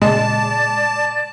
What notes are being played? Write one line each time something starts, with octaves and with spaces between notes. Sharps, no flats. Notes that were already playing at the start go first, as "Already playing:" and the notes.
A#2 C#3 G#3 D5 A5